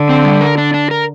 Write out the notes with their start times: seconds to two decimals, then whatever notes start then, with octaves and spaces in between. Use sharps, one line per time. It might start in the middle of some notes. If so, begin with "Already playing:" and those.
Already playing: D3
0.09 C4
0.25 G3
0.41 A#4
0.58 D4
0.74 D4
0.91 A#4